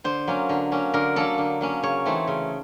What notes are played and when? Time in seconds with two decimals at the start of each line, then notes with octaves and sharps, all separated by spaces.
0.04 D3 C5
0.28 F#3 A#3 C#4
0.49 D3
0.72 F#3 A#3 C#4
0.94 D3 A#4
1.16 F#3 A#3 C#4 A4
1.38 D3
1.61 F#3 A#3 C#4
1.83 C#3 C#5
2.05 E3 A3 C4 D#4
2.27 C#3